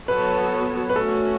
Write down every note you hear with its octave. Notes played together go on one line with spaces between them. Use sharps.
F#3 B3 F#4 A4 B4 C#5
B4
A3 C#4 F#4 A4